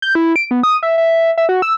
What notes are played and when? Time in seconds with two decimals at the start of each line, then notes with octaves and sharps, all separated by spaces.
0.02 G6
0.15 E4
0.36 D7
0.51 B3
0.63 D#6
0.83 E5
0.98 E5
1.38 E5
1.49 F#4
1.62 E6